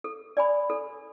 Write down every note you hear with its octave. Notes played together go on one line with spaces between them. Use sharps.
A4
D5 G#5 B5
A4